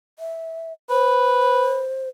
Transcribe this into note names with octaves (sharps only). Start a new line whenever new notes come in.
E5
B4 C5